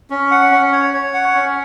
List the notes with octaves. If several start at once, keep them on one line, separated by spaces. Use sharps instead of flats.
C#4
F#5
C#4
C#5
C#5
F#5
C#4